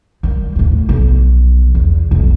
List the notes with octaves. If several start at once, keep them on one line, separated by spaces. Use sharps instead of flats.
D#3 G3
D#2 A2
B1 F3
E2
B1 F2